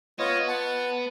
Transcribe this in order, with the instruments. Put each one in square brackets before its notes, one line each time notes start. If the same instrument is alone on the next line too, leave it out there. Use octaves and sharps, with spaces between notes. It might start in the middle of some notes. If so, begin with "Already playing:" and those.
[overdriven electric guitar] B3 [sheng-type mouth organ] F4 C#5 D#5
[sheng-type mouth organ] F#5 A5